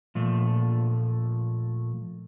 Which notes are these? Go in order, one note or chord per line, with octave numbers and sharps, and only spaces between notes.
A#2 F3 A3